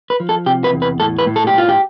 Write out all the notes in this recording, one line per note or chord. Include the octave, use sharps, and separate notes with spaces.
B4
F3
A4
C3 G4
B4
E2
B4
A2 A4
B4
A2
A4
G4
A2 F4
G4